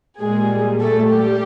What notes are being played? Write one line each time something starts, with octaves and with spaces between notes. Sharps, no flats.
A#2 G3 G#3 A#3 G#4
A3 A4
G3 G4